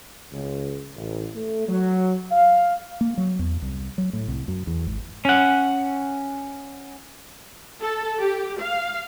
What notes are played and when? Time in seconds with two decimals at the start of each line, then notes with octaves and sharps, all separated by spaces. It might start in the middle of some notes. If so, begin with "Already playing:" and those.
0.32 C#2
0.95 A1
1.35 A3
1.68 F#3
2.30 F5
3.01 A#3
3.18 F#3
3.39 E2
3.62 C2
3.98 F#3
4.13 A2
4.28 C2
4.48 F#2
4.67 E2
4.87 G#1
5.25 C#4 F#5
7.81 A4
8.21 G4
8.60 F5